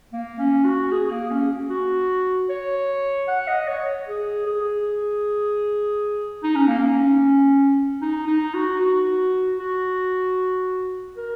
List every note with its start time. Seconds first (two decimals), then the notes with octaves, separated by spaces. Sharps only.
0.13 A#3
0.39 C#4
0.65 F#4
0.92 G#4
1.11 A#3
1.31 C#4
1.70 F#4
2.49 C#5
3.28 F#5
3.48 D#5
3.68 C#5
4.08 G#4
4.47 G#4
6.44 D#4
6.56 C#4
6.68 A#3
6.80 C#4
8.02 D#4
8.27 D#4
8.54 F#4
8.80 F#4
9.60 F#4
11.17 A#4